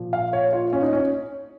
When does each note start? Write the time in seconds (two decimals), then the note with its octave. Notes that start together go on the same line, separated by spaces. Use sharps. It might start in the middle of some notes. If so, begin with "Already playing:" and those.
Already playing: A#2 F3 A#3
0.13 F5
0.33 C#5
0.53 F4
0.73 C#4
0.82 D#4
0.93 C#4